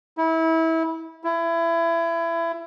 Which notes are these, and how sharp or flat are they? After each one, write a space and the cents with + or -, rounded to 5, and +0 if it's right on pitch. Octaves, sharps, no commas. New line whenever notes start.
E4 -25
E4 +25